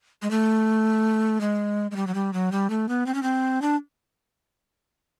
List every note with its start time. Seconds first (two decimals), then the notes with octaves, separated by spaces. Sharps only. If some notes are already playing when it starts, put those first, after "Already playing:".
0.22 G#3
0.31 A3
1.41 G#3
1.91 G#3
1.96 G3
2.07 F#3
2.14 G3
2.33 F#3
2.52 G3
2.70 A3
2.89 B3
3.06 C4
3.14 C#4
3.23 C4
3.62 D4